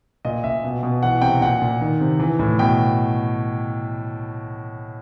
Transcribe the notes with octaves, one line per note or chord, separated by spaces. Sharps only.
A#2 D#5
A#2 E5
B2
B2
E3 F#5
C3 G5
A#2 F#5
A#2
D#3
C3
E3
A2
B2 G5